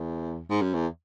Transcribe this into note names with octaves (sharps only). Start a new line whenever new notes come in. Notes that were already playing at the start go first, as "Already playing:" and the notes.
Already playing: E2
G#2
F#2
E2